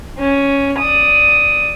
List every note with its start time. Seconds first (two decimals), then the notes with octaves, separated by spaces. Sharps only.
0.18 C#4
0.78 D5 D#6